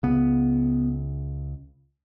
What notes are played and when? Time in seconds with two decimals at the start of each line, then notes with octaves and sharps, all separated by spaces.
0.03 C#2 C#3 B3